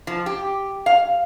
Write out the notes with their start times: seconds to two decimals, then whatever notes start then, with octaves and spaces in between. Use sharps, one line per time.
0.07 F3
0.26 G4
0.86 F5